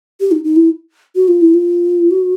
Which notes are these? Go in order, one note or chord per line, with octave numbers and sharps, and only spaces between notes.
G4
D#4
D#4
E4
F#4
F4
E4
F4
F#4